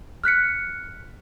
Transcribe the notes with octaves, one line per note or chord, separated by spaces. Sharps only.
F6 F#6 B6 C#7